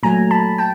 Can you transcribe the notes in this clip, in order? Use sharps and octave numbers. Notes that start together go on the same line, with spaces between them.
A#2 F#3 A3 G#5 A#5
A5 B5
G5 A5